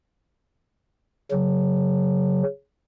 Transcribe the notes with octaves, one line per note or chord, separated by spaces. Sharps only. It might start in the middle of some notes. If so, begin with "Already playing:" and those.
C#3 F#3